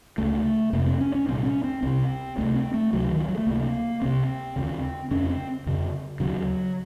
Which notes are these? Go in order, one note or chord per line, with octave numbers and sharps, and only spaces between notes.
C#2 C#3 A3
F2 C3 A#3
C4
C#4
C#4
C2 A#2 C4
C#4
C4
C2 C3 C4
C2 C3 A3
C4
A3
C#2 C3 F#3
D#3
F3
F#3
A3
C#2 C3 A#3
C2 C3 C4
D#2 C#3
F2 C#3 C#4
C4
F2 C#3
D#2 C#3 F#3